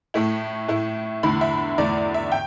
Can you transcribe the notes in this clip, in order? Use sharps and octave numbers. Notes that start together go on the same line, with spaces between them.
A2 A3 E4
A2 A3 E4
E2 D3 A3 E4 B5
E5
E2 D3 A3 E4 D5
E5
G5